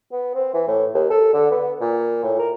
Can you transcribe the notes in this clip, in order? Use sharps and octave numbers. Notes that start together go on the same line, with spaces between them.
B3
C4
E3
A2
D#2
A4
D3
B3
A#2
A2
A#4